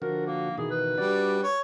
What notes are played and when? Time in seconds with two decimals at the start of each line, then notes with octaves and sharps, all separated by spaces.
0.02 D3 F3 F#4 A#4
0.27 A#3
0.58 B2 D#3 E3 G#4
0.71 B4
0.98 G3 D4 F#4 D5
1.43 C#5